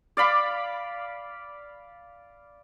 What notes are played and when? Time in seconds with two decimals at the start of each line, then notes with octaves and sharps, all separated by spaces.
0.17 D5 F5 B5 D6